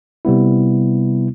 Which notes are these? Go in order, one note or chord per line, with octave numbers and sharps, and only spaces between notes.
C3 G3 B3 E4